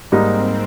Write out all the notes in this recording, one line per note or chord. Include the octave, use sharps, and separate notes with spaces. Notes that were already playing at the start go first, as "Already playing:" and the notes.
G#2 G3 A#3 C4 D#4